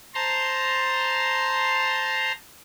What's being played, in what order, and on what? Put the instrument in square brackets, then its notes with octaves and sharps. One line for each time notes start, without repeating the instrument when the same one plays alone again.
[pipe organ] C5 A5 A#5 C6